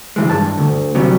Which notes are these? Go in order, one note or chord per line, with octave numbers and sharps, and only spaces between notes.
C#2 G#2 E3 G#3
G2 A5
D2
C3 F#3 G3